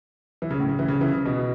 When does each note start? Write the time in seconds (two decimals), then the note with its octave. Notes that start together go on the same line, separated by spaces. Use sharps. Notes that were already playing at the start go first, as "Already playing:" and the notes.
0.42 E3
0.51 C#3
0.60 A2
0.69 C#3
0.79 E3
0.88 C#3
1.01 E3
1.13 C#3
1.26 B2